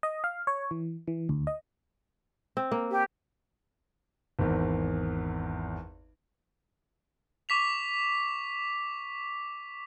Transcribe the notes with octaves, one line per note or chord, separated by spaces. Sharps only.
D#5
F5
C#5
E3
E3
D2
D#5
C4
A#3
G4
G#1 E2
C#6 D6 B6 F7